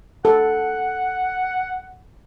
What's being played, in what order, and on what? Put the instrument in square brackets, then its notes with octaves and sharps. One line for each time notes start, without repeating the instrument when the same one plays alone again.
[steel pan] A4 [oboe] F#5